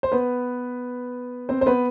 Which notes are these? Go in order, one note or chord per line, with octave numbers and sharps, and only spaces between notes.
C5
B3 B4
C4 C5
C5
B3 B4